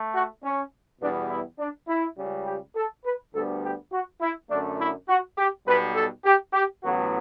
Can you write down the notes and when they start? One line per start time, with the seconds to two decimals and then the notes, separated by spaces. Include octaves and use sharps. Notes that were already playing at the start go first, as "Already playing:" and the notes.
Already playing: A3
0.13 F#4
0.42 C#4
1.00 E2 B2 G3 B3 D4
1.29 E4
1.59 D4
1.88 E4
2.16 C#2 C#3 G3
2.46 G4
2.75 A4
3.04 B4
3.33 D2 D3 G3 B3 A4
3.63 G4
3.91 F#4
4.21 E4
4.49 F#2 D3 A3 D4
4.79 E4
5.08 F#4
5.36 G4
5.66 B1 B2 G3 B4
5.95 A4
6.25 G4
6.53 G4
6.82 A1 A2 F#3 B3 F#4